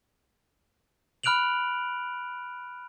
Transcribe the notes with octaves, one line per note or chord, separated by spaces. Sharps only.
B5 F6 F#6 D7 F7 F#7